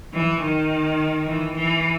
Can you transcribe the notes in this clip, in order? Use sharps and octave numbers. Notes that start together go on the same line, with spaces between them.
E3
D#3
E3
E3